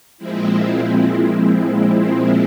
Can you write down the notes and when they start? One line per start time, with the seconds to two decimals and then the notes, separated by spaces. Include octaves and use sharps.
0.18 A#2 F3 G#3 C4 E4